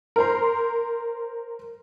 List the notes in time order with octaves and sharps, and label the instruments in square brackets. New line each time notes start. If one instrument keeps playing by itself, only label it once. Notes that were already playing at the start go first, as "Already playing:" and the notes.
[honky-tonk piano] A#4 C5 C6